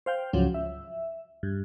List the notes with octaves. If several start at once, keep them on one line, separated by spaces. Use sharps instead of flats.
C5 F5 G5
C#2 G#2 F3 F#3 C#4
E5
G2